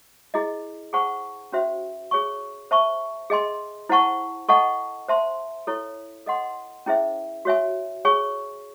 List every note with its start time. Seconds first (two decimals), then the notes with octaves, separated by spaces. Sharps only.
0.34 E4 G#4 D#5
0.93 G#4 C5 F#5 A5 C#6
1.52 C#4 F#4 C5 E5
2.11 G#4 C#5 G#5 C#6
2.71 C5 E5 A5 C#6
3.30 G#4 D#5 G#5 C6
3.89 E4 C5 F#5 A5 C#6
4.49 A4 D#5 F#5 A5 C#6
5.08 C5 E5 A5 C6
5.67 E4 A4 C#5
6.26 A4 D#5 F#5 C6
6.86 C#4 E4 G#4 C5 E5
7.45 F#4 C#5 E5 G#5
8.05 G#4 C#5 G#5 C#6